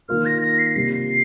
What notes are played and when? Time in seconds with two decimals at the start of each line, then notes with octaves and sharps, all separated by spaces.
0.09 D#3 A#3 F4 A#4 F6
0.26 A#6
0.42 A#6
0.59 C7
0.67 A#6
0.75 C3 G3 A#3 F4 C7